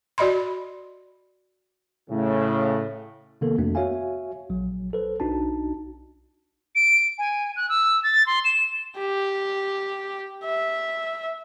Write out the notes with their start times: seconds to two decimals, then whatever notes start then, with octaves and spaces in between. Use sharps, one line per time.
0.18 F#4 D5 D#5 B5 C6
2.09 A2 C#3
3.41 C3 D#3 A#3 B3 A4 A#4
3.58 F2 A3 B3 D4 F#4
3.75 F#4 C#5 E5 F5 G#5
4.50 A#1 F#3
4.93 A4 B4 C5
5.20 B1 D4 D#4 F#4 A5
6.76 D7
7.18 G#5
7.56 F#6
7.69 E6
8.04 A6
8.27 C6
8.45 E7
8.99 G4
10.45 E5